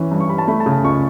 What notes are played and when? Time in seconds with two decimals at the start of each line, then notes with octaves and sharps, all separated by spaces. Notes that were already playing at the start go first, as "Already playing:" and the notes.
Already playing: E3 C#4
0.11 G2
0.20 C#6
0.29 G3 B5
0.38 A5
0.48 A3 B5
0.60 A5
0.66 C#3
0.73 A5
0.84 C#2 C#6